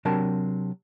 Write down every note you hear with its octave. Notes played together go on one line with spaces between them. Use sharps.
C3 F#3 D4 A#4 A5